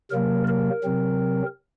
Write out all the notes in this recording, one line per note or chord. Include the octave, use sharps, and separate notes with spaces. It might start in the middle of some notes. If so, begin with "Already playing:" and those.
C3 F#3 A#3 A#4
A#4
C3 F#3 C4